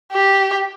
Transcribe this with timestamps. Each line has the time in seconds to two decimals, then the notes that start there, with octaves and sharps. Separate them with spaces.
0.12 G4